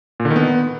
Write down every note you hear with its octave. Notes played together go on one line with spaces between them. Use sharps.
A#2
D3
D#3
B3